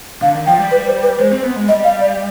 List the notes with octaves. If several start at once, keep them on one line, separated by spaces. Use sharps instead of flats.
D3 F5
D#3
F3 G5
G3
B4
C5
B4
G#3 C5
C4
B3
G#3
G3 D#5
F5
D5